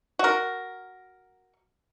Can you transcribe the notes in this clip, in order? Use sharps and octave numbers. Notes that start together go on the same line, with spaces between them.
F#4 A#4